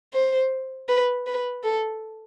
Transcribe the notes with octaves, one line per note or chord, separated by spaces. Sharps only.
C5
B4
B4
A4